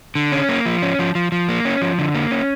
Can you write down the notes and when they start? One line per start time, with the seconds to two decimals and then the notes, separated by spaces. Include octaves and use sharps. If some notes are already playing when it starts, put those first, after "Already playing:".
0.15 D3
0.32 C#4
0.49 A#3
0.66 F3
0.82 C#4
0.99 F3
1.15 F3
1.32 F3
1.49 A#3
1.65 C#4
1.82 F3
1.99 D3
2.15 A#3
2.31 C#4